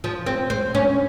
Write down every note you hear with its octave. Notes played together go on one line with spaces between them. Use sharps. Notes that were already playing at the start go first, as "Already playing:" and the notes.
F3
C4
C4
C#4